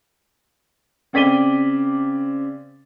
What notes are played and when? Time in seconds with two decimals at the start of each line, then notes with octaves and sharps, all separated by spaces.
1.13 C#3 C4 D5 B6 D#7 G7